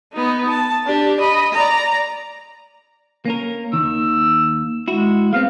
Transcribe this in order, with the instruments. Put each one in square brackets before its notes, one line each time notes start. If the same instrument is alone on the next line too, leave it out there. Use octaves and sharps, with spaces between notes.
[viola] B3 D#4
A5
D4 G4
D#5 B5
D5 A#5
[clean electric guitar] A#3 C#4 A#4
[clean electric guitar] D#2 D#3 [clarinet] E6
[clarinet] G#3 [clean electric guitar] E4 F#4
[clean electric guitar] G#3 B3 C4 [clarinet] F5